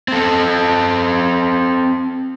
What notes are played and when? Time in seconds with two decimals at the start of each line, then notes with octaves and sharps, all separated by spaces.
0.08 C4 A4